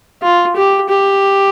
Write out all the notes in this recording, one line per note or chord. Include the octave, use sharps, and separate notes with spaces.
F4
G4
G4